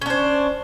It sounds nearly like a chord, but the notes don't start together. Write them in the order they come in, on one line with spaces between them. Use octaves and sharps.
C#4 D4 C5